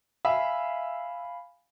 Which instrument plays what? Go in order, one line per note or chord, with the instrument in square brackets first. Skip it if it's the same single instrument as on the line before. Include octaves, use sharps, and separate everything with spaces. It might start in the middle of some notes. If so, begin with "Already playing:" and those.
[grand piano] E5 [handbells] F5 G#5 B5